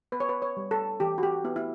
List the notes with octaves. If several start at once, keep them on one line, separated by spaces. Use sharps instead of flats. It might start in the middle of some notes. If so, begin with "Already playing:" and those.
B3 B4
C#5
B4
C#5
G3
A4
E3 G4
F#4
G4
B3 E4
E4